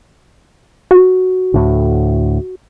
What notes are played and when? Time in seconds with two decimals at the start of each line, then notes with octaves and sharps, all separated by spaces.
0.91 F#4
1.54 D2 A2 D3